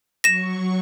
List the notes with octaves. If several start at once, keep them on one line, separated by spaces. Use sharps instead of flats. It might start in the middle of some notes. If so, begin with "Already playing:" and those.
F#3 C#6 A#6 E7